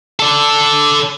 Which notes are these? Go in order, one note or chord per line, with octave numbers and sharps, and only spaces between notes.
A4 D5